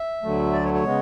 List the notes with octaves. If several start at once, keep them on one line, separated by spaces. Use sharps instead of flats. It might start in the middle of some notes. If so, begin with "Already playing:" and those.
Already playing: E5
D2 D3 F#3 A3
D5
C#5
C#5
C#3 G#3 B3